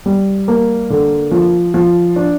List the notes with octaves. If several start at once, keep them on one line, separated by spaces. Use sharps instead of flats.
G3
A#3
D3
F3
F3
D4